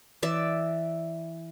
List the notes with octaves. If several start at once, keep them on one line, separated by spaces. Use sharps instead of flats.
E3 D5 E5